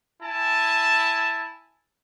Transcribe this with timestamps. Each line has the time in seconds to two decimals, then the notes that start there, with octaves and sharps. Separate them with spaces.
0.22 E4 G#5 A5